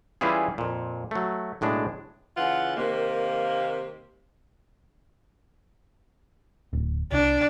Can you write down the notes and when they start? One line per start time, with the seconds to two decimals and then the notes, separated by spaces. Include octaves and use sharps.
0.21 E3 G3 C#4 E4 F4 G#4
0.58 F2 A#2
1.11 F#3 A3
1.61 B1 A2 G#3 D4
2.37 C#3 E3 F4 F#5
2.76 C3 D#3 A#3
6.73 D1
7.12 C2 D4